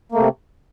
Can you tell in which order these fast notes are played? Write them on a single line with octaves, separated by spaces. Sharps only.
A#3 A3 C3